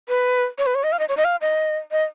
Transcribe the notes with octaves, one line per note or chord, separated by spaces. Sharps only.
B4
C#5
B4
C#5
D#5
F5
D#5
C#5
D#5
F5
D#5
D#5